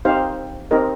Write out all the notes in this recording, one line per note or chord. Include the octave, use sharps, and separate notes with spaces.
C4 D#4 G4 C5 F5
C4 D#4 G4 A#4 D#5